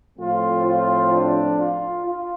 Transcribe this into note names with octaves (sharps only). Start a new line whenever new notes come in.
A2 F3 A3 C4 F4
F4
D4
F4
F4